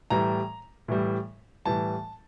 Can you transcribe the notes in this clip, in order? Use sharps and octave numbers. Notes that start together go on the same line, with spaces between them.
A2 E3 G3 A#5
A2 E3 G3
A2 E3 G3 A5